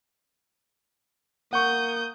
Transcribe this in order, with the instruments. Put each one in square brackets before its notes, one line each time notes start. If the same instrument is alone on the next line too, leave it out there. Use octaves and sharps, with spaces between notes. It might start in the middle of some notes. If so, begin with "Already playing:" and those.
[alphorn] A#3 [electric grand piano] F#5 C#6 [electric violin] D#6 G6